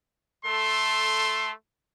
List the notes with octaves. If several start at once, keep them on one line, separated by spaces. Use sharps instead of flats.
A3 A4 C6